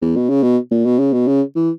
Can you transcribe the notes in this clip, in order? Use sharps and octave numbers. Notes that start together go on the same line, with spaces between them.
E2
B2
C#3
B2
A#2
B2
C#3
B2
C#3
E3